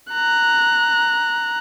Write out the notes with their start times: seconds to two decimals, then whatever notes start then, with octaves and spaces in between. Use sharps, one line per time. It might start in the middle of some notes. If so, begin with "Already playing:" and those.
0.11 A#5 F#6